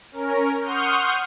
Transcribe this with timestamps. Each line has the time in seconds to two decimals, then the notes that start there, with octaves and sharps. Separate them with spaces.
0.12 C#4 A#4
0.61 F#5 C6 C#6 D#6 F6 G6